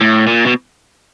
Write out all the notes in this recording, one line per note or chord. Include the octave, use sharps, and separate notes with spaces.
A2
A#2
B2